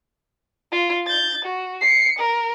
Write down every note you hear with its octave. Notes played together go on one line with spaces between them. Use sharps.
F4
G6 A6
F#4
C7 C#7
A#4